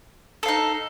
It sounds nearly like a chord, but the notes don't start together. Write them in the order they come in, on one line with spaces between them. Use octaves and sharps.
A4 F5 D#4